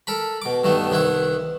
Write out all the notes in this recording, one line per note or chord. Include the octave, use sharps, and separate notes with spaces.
A4 A#4 B5
B2 D6
G2 D#3 A3 B3
C2 D#3 B3 E4 F#5